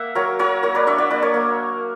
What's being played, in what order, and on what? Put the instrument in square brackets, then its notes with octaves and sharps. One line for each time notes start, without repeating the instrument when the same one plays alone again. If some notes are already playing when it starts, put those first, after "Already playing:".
Already playing: [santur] A#3 E5 F#5
F#3 A#4 C#5
F#3 A#4 C#5
A#3 A#4 C#5
B4 D5
D4 C#5 E5
D5 F#5
A#3 B4 D5
A#4 C#5
A#3